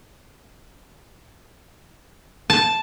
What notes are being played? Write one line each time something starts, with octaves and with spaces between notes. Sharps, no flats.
A5